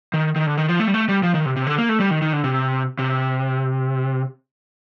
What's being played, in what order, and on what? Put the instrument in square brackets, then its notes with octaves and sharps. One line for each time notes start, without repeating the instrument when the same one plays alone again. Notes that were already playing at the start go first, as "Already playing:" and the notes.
[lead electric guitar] D#3
D#3
D3
D#3
F3
A3
G3
A3
G3
F3
D#3
C3
C3
D3
A#3
A3
G3
D#3
D#3
D3
C3
C3